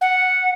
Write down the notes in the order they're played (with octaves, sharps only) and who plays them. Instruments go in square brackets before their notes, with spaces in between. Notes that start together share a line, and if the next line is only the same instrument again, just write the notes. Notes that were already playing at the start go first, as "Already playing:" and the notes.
[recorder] F#5